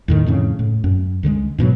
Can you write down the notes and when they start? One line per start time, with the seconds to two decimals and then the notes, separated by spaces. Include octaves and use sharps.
0.08 E2 A2 D#3
0.26 F2 A2 C#3
0.59 A2
0.84 F#2
1.23 C#2 D3 F3 G#3
1.58 G#2 B2 E3 F#3